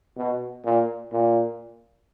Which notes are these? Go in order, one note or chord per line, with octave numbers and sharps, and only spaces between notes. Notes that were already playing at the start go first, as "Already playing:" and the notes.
B2
A#2
A#2